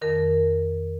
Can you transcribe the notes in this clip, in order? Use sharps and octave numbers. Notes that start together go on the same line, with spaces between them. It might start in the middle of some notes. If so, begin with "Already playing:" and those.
F2 D#3 A#4